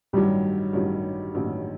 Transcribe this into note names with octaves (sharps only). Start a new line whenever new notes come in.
A1 G2 D#3 F#3 G3
A1 G2 D#3 F#3
A1 G2 D#3 F#3